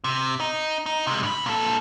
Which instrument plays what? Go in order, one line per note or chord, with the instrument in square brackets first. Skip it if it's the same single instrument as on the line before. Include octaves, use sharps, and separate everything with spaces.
[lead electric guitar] C3
D#4
D#4
C3 G#3
G2 B5
A#2 A4